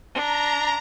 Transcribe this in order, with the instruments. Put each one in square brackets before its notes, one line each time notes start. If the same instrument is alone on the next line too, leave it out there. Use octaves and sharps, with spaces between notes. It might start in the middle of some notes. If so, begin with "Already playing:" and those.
[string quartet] D4 [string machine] A#5